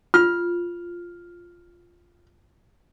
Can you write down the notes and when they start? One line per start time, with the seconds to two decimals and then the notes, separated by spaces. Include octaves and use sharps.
0.14 F4 F6